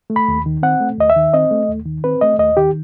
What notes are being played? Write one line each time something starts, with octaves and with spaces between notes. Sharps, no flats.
A3
B5
D#2
D#3
C4 F#5
A3
D#2 D#5
E5
D#3
C4 D#5
A3
D#2
D#3
C4 B4
A3 D#5
D#2 D#5
D#3 G4